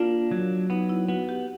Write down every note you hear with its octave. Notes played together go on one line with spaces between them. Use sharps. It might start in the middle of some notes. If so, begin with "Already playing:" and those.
Already playing: A#3 D4 F4
F#3
B3 D#4
E4
B3 F#4
G4